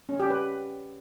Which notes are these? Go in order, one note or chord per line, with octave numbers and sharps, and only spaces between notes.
C#4
G4
B4